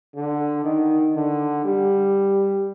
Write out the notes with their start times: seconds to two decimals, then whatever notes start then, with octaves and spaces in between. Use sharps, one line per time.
0.15 D3
0.64 D#3
1.15 D3
1.65 G3